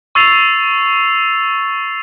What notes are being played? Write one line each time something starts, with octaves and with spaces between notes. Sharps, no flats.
C#6 E6 A6 C7 F7